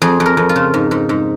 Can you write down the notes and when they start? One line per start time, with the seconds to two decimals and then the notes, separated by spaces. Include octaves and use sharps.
0.02 F2 G#4
0.20 F2
0.26 A#4
0.37 F2
0.49 F4
0.56 C#3
0.74 G#2
0.91 G#2
1.09 G#2